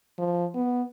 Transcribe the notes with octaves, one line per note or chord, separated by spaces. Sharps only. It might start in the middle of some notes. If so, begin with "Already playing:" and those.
F3
B3